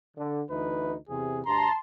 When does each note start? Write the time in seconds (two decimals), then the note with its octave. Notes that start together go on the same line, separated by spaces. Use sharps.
0.17 D3
0.50 D2 E3 D#4 B4
1.09 E2 C3 G#4
1.46 D2 G2 A5 A#5 C6